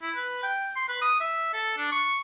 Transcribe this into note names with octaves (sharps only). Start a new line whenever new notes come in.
E4
B4
G5
C6
B4
D#6
E5
A4
D4
C#6